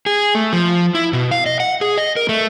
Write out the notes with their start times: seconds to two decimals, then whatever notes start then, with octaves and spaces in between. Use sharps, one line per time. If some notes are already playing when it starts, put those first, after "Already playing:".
0.06 G#4
0.35 A3
0.53 F3
0.95 E4
1.13 B2
1.31 F5
1.46 D#5
1.60 F#5
1.81 G#4
1.98 D#5
2.16 A#4
2.29 A3